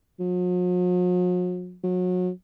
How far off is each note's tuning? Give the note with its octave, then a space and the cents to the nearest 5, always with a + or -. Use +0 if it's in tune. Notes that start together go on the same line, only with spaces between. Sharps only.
F#3 -45
F#3 -30